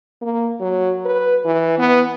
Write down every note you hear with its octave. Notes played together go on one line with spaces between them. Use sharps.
A#3
F#3
B4
E3
B3